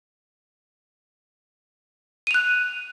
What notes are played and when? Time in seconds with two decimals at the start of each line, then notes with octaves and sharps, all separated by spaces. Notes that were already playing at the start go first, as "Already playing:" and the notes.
2.27 D#7
2.31 F7
2.34 F#6